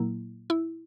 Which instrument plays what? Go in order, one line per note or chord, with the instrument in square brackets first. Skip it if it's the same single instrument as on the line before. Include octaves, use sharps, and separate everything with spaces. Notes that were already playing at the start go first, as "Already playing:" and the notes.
Already playing: [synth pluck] A#2 F#3 A#3 E4
E4